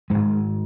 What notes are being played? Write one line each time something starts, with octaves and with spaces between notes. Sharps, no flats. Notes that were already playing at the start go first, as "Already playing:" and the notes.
G#1 G#2 G#3